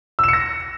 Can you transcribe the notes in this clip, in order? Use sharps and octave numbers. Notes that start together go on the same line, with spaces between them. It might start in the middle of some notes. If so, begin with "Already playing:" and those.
E6 A#6 C#7 E7